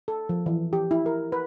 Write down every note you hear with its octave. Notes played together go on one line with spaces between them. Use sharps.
A4
F3
E3
G4
E4
A#4
B4